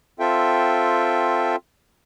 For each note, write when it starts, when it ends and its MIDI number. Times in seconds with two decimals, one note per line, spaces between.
0.20 1.56 60
0.20 1.56 65
0.20 1.56 69
0.20 1.56 76
0.20 1.56 79